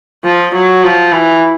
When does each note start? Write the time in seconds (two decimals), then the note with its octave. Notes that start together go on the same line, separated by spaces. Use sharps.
0.24 F3
0.54 F#3
0.83 F3
1.12 E3